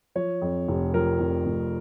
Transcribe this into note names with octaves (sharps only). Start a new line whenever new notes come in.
F3 C#5
F2
F1
F3 A#4
F1
F1